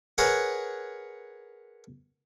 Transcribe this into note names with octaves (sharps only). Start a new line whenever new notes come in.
G#4 A#4 B4 C#5 F#5